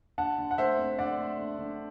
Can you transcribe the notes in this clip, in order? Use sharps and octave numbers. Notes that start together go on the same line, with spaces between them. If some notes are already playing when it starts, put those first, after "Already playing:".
D3 F#5 A5
D3
F#5
A3 C5 E5
C4
D3 D5 F#5
A3
D3
D3